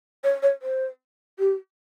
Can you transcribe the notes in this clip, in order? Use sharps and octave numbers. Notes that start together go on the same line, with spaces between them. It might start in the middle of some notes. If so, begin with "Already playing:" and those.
C#5
C#5
C5
G4